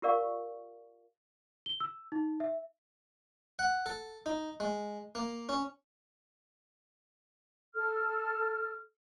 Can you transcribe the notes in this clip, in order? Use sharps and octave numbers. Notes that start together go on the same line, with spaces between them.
F4 G4 A#4 D5 F5 C#6
G7
E6
D#4
E5
F#5
A4
D#4
G#3
A#3
C#4
A4 F6